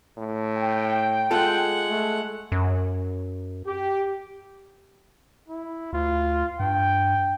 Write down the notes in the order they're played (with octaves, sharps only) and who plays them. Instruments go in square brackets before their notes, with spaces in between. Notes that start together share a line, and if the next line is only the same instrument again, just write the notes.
[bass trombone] A2
[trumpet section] G5
[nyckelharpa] G#3 F#5 [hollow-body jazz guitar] F4 A4
[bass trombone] A3
[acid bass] F#2
[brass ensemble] G4
[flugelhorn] E4
[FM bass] D2 [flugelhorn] F4
[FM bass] G2 [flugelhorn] G5